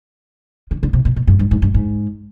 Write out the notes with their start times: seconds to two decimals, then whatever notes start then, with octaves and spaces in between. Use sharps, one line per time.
0.71 D3
0.83 D3
0.93 C3
1.05 B2
1.16 B2
1.27 G2
1.39 G2
1.51 G#2
1.62 G2
1.74 G#2